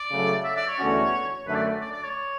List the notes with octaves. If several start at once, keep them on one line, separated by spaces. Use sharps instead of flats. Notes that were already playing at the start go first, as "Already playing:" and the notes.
Already playing: D5
C#3 F#3 A3
E5
D5
C#5
E2 D3 A3 C#4 F#4
F#2 D3 A3 B4
D5
D5
D5
C#5